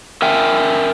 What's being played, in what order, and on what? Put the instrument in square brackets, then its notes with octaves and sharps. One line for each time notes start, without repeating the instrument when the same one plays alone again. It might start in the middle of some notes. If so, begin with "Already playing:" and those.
[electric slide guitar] A#4 E5 G5 G#5